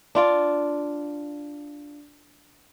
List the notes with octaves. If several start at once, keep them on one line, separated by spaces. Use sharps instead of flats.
D4 F4 D5